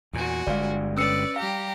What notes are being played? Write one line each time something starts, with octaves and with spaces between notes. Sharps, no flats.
E2 A#2 F#4 G#5
G1 G2 G#3 D5 F5
C#4 B4 D5 E6 C#7
G3 G4 F5 A#5